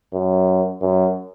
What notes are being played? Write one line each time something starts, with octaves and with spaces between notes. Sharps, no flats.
F#2
F#2